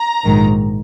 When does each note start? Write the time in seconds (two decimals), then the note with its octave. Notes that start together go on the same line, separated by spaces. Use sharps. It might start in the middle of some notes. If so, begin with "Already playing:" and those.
Already playing: A#5
0.24 A#1 G#2 D#3